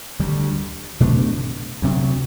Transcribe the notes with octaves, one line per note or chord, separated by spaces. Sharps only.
D2 D3 G3
B2 A3 D4
D2 C3 F#3